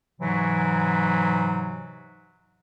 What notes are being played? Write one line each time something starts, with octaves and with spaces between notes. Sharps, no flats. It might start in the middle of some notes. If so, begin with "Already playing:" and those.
G#2 C3 E3 F#3